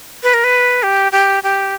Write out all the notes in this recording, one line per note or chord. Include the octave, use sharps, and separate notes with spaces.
B4
A#4
B4
G4
G4
G4